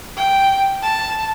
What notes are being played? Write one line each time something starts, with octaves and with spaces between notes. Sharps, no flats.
G5
A5